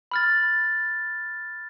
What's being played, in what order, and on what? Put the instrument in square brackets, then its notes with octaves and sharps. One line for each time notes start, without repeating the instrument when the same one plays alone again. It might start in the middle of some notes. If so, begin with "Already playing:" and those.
[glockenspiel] B5 F6 A6